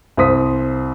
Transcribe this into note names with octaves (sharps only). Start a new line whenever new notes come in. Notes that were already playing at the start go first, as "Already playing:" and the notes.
C2 C5 D#6 B6